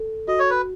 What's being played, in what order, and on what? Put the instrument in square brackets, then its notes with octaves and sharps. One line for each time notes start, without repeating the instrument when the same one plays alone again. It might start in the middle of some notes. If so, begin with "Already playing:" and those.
Already playing: [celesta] A4
[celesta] F#4 [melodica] D#5
[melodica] C#5
B4